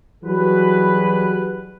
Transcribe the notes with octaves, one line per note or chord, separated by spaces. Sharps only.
E3 F#3 G3 F#4 G#4 B4